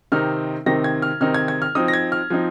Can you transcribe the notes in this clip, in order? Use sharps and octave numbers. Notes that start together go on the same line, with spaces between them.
C3 D#3 C4 D#4 F6
C3 D#3 C4 D#4 A#6
G#6
F6
C3 D#3 C4 D#4 F6
G#6
G#6
F6
F3 C4 D#4 D#6
A#6
G#6
F6
F3 C4 D#4